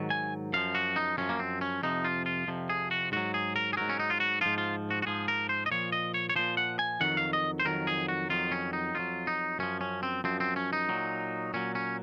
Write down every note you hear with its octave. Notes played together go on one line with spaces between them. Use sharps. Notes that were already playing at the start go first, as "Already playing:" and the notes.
Already playing: G#2 D#3 F#3
G#5
F#2 F3 F5
F#4
D#4
F#2 F3 C#4
A#3
C4
C#4
F2 C3 F3 D#4
F4
F4
F2 C3 F3
G#4
F#4
G#2 F#3 F#4
G#4
A#4
G#4
G#2 F#3 A#4
C#4
D#4
F4
F#4
G#2 F3 F4
F4
F#4
F#4
G#2 F3 G#4
A#4
C5
D#5
A#2 F3 C#5
D#5
C#5
C#5
A#2 F3 C5
F#5
G#5
F2 D#3 F#3 F#5
F5
D#5
C5
F2 D#3 F#3 A#4
G#4
F#4
F2 D#3 F#3 F4
C#4
D#4
F2 D#3 F#3 F4
D#4
F#2 F3 C#4
C#4
C4
F#2 F3 C4
C4
C#4
D#4
A#2 F#3
A#2 F#3 C#4
C#4